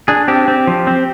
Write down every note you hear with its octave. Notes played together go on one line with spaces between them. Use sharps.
D4 G#4
C4 G4
C4
F3
C4